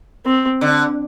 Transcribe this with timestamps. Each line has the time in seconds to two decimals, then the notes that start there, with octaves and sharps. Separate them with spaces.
0.26 C4
0.61 D3